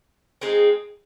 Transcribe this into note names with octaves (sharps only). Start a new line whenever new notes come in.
G#3 C4 D#4 G#4